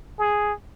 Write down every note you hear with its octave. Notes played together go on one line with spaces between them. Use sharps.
G#4